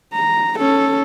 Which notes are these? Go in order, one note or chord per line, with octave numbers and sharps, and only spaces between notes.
A#5
C#4 A4